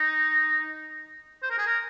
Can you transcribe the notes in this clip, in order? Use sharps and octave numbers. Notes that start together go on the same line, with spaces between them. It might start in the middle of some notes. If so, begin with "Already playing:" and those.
Already playing: D#4
C5
A#4
G#4
A#4